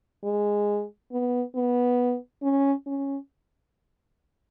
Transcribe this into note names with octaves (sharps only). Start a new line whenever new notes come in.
G#3
B3
B3
C#4
C#4